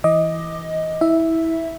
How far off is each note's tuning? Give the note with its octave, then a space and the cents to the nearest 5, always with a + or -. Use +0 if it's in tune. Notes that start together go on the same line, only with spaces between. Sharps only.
E3 +0 D#5 +15 D6 +20
E4 -20 E5 +0